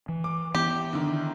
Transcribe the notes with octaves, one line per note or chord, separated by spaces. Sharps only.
E3
D6
E3 B3 G4
D3 D#3